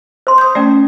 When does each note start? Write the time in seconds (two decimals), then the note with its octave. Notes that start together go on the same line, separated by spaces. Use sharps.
0.27 C5 C6
0.38 D#6 G6
0.55 A3 C#4 D5 G5